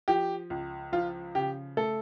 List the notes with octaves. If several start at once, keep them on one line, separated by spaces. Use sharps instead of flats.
F3 G4
C#2
F3 F4
C#3 G4
A3 A4